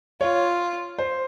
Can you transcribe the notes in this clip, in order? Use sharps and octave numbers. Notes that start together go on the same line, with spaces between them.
F4 C#5
C5